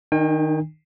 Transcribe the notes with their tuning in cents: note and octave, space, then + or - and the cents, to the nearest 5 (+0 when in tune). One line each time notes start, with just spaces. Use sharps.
D#3 +0 D4 +40 G5 +45